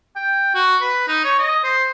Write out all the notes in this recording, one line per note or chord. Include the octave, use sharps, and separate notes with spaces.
G5
F#4
B4
D#4
C#5
D#5
C5